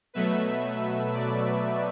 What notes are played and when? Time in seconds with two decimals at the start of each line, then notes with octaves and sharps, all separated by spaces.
0.14 B2 F#3 A3 B4 E5
1.13 D5